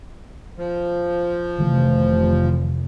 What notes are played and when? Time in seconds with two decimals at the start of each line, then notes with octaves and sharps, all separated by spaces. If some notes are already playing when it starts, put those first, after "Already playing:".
0.57 F3
1.60 F1 D#3 E3 A3